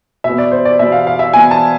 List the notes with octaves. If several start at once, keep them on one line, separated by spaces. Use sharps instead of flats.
B2 B3 E5
D5
C5
D5
B2 B3 E5
F5
F5
E5
B2 B3 G#5
A5